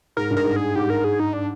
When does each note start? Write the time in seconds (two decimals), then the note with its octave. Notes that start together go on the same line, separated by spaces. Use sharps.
0.17 G#2 A#4
0.31 G2
0.37 A#4
0.44 G#2
0.56 G#4
0.75 G#2 G4
0.90 A#4
1.04 G#4
1.20 D#4
1.33 D4